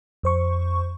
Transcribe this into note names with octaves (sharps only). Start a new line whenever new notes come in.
F2 C5 C#6